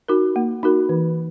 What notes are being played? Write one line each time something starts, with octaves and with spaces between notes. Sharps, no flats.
D#4 F#4 A#4
A#3
D#4 F#4 A#4
E3